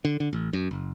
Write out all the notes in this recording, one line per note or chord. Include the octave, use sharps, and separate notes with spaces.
D3
D3
A1
F#2
F#1